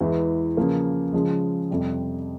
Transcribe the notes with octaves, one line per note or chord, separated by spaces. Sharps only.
E2 E3 G#3
C#3 F3 A#3
C#3 F3 G#3
F2 C3 G3